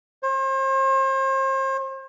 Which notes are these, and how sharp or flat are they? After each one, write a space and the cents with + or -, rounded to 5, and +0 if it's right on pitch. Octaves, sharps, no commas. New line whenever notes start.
C5 +40